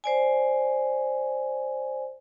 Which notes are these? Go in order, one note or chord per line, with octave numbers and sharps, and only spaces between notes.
C5 D5 G#5